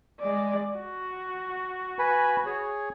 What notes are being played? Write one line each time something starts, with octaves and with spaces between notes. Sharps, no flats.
G#3 D5
F#4
B4 G#5 B5
G#4 C#5